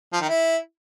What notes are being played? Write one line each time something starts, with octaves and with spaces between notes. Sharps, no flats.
F3
D#3
E4